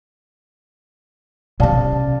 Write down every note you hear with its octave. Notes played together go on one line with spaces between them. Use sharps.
C3 C#4 D5 F5 A5